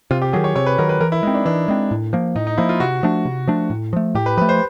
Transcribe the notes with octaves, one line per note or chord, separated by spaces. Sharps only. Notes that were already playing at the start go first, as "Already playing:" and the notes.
C3 F4
G4
D#3 F#3 G#4
C#5
C3 C#5
B4
D#3 F#3 A#4
B4
E3 A#4
E4
G#3 C4 D#4
D4
E3 D4
G#3 C4
A2
F3 A#3
A2 D#4
D#4
F3 A#3 E4
F4
C3 F#4
F3 A3 D4
C3
F3 A3 D4
A2
F3 A3
A2 G4
B4
F3 A3 B4
C5